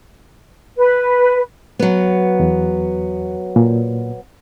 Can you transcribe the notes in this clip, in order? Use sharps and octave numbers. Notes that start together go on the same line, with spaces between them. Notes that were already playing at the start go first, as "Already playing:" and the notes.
B4
F#3 B3
E2
A#2